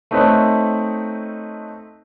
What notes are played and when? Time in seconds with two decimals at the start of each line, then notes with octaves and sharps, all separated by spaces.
0.11 A3 C4 D#4 B4 C#5 E5